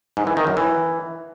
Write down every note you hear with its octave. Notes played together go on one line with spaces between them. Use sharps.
G#2
E3
D#3
F#2
E3